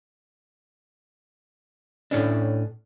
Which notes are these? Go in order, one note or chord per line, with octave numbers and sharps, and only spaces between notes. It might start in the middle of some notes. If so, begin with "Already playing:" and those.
A2 C#4 D4